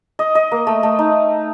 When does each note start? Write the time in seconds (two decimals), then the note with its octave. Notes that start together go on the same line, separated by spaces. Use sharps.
0.19 D#5
0.35 D#5
0.51 A#3
0.67 A3
0.83 A3
0.99 D#4